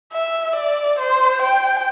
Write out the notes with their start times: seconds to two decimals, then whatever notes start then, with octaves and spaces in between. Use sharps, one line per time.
0.13 E5
0.55 D5
0.99 C5
1.42 G5